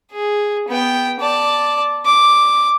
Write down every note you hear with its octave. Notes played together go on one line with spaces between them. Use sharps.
G#4
B3 G5
D5 A5
D6